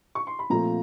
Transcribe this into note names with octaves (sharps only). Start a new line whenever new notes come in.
C#6
C6
B5
A#2 F3 A3 C4 A#5